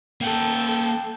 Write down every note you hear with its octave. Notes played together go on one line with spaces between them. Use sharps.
A#3 A4 F#5 G5